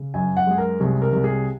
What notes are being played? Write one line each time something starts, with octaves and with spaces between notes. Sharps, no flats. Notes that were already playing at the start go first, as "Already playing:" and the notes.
Already playing: C#3
F#2 G#5
F#5
G#3 G#4
A#4
C2 G#4
A#4
C2
G#4